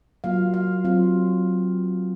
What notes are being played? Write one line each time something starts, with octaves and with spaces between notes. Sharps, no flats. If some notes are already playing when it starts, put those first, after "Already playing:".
F#3 A#3 F4 F5
F5
F#3 C4 F4